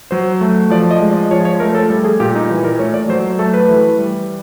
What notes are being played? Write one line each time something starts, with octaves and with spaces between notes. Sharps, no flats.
F#3 C5
A3
F3 D5
D#5
G#3
D5
F3 C#5
C#5
A3 A#4
A4
G3 A4
G#4
A#2 G4
D#4
E3
A#4
A3 C#5
D5
F#3 C5
A3 A4
B4
E3
G3